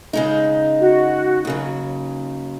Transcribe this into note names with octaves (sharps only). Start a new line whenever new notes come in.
C#3 G#3 D#4
F#4
D#2 C#3 F#3